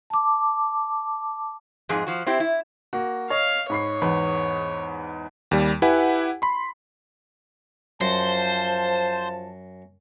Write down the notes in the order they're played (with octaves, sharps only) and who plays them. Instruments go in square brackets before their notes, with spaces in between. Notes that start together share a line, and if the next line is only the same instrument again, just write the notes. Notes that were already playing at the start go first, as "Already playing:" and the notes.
[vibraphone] A5 D6
[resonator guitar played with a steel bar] F2 G#2 G#3 G#4
F3 F#4
C4 E4 G4
E4
[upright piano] A#3 F#4
[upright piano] C#5 D#5 [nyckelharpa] F5
[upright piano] G#2 B5 C7 [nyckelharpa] C#5
[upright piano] E2 G#2 B4
[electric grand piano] D#2 G3
E4 G4 B4 F#5 G#5
B5 C6
[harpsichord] F#2 [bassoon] F3 [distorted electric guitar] C5 [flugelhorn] A5